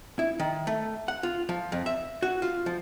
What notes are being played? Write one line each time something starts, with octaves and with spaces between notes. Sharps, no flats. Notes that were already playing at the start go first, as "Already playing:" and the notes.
E4
D#3
A3
F#5
F4
F3
F2
E5
F#4
F4
F3